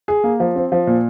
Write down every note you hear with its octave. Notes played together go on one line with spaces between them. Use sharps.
G#4
A#3
F3
C4
F3
A#2